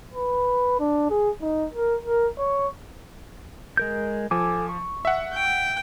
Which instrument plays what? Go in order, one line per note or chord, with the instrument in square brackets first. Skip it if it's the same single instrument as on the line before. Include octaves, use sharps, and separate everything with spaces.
[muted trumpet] B4
D4
G#4
D#4
A#4
A#4
C#5
[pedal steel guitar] G#3 A#4 G6
[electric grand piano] F3 [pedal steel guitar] A4 G#5 D6
[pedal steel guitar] C#6
[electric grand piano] E5 F#5
[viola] G5